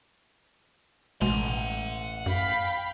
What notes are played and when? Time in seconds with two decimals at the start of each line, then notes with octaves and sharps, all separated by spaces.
1.21 A1 B2 G#3 F#5 C6
2.26 F#2 F5 G5 B5